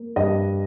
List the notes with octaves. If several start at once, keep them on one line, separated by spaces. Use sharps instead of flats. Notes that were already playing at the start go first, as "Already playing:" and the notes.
Already playing: A#3
G2 D#5